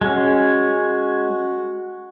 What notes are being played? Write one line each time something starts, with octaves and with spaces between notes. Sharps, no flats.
G#3 C#4 F#4